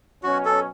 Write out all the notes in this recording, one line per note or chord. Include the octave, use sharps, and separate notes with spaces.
B2 F#3 C#4 F#4
A4